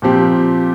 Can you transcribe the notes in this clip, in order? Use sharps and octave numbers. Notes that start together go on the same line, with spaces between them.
A#2 F3 C4 G4